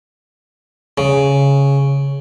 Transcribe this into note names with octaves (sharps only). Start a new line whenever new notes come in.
C#3